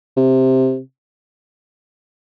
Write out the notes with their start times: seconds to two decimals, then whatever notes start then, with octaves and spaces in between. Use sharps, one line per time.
0.17 C3